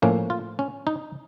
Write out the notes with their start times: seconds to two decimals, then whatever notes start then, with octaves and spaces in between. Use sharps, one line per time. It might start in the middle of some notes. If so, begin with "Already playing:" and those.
0.02 A2 F3 A#3 C#4
0.30 F4
0.59 C#4
0.87 D#4